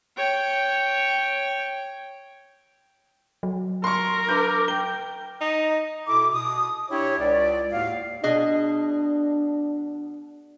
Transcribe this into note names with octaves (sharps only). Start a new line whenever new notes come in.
C#5 G5
F#3
A#4 C6 C#6
D4 B4 D6 G6
G5 G7
D#4
B2 E4 A4 D6
B2 D#6
D4 E4 G4 C#5
C#2 D5
D#2 A2 F#4 F5
B2 D4 G#4 D#5